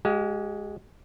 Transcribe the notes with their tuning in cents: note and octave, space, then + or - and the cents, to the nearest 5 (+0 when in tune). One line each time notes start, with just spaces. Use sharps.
G#3 +0 G4 -40 F5 +0